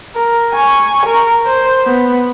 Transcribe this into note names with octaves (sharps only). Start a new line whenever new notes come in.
A#4
G#5 C#6
A#4
C5
B3